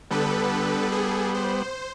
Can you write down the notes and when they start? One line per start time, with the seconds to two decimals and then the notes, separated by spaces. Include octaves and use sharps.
0.11 D3 G3 B3 A4 B4
0.92 G#4 A4
1.34 C5